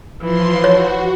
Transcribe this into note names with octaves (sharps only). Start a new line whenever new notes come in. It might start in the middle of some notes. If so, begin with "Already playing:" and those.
E3 F3 C6
F#4 C#5